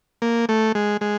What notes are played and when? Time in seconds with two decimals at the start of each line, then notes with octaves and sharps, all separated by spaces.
0.22 A#3
0.49 A3
0.75 G#3
1.01 G#3